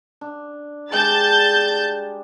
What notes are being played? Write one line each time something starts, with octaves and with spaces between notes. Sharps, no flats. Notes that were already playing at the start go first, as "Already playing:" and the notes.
D4
G3 G#3 D4 A5 G6 A6